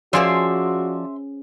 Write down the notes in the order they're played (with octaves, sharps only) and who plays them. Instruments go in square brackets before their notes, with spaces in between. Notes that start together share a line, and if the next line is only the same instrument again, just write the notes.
[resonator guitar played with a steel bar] F3 D5 [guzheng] C#4 G#4 C5 [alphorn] F#4 [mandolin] E5 C6